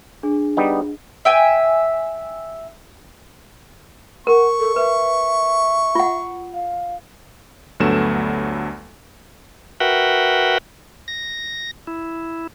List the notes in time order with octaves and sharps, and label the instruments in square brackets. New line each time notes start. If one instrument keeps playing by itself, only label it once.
[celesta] D4 G#4
[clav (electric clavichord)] G3 B3 D#4
[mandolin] E5 G5 G#5
[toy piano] A#4 [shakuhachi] F#5 [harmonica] C#6
[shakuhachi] A4
[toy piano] B4 [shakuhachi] E5
[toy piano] F4 F#5
[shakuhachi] F5
[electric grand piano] D2 G2 F#3 A3 B3 E7
[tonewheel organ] F#4 A#4 B4 E5 F#5 G5
A#6
E4